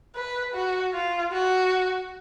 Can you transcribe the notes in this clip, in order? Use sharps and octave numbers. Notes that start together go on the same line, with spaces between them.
B4
F#4
F4
F#4